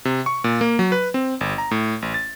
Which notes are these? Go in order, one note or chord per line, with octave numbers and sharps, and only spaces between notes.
C3
C#6
A#2
A#3
F#3
B4
C4
G1
A#5
A2
A1
A6